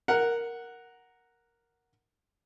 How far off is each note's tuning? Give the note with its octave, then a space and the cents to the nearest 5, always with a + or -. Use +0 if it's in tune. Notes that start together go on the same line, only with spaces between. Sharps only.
A#4 +0 F#5 +0